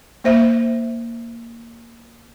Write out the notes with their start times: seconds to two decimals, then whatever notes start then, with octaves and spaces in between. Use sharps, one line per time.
0.24 A#3 C5 E5